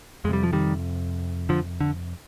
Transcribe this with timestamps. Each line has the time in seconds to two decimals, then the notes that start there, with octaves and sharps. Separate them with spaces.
0.24 F2 G#3
0.29 C3 G3
0.43 F3
0.53 D#3 G3
1.49 D3 F3
1.81 D3